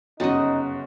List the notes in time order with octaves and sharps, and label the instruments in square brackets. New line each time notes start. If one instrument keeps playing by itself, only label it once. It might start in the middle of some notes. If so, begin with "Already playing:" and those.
[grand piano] G1 F#2 C#3 [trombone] D#4 [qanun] F#4 D#5